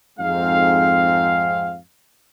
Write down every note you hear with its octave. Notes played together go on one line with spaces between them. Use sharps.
F2 G#2 C4 F5